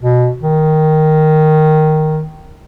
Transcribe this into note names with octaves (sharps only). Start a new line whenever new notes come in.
B2
D#3